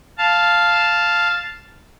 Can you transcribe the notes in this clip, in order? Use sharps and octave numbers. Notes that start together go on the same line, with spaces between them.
F5 A5